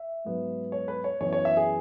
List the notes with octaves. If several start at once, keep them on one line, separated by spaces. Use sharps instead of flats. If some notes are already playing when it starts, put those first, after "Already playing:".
Already playing: E5
G#2 F#3 B3
C#5
B4
C#5
F#2 E3 B3 C#5
C#5
E5
G#4